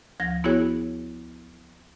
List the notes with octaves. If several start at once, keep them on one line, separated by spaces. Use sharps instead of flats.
D2 F3 A#6
B3 E4 F#4 G#4 C#5